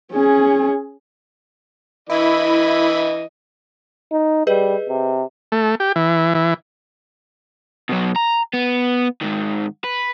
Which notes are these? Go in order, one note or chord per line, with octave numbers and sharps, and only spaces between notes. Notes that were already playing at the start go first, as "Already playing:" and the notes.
C#4 G#4
E3 E4 D#5 B5
D#4
G3 G#4 B4 D#5
C3
A3
G4
E3
E3
B2 F#3
A#5
B3
G#2 D#3
B4